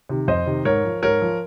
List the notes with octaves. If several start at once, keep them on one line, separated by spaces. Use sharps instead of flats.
C3 D#3
F2 C5 D#5
C3 D#3
G#2 A#4 C#5
F3
G#2 A#4 C#5
F3